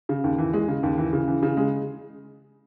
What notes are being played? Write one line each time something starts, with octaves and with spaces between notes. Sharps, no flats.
C#3
D#2
E3
G#3
C#3
D#2
E3
C#3
E3
C#3
G#3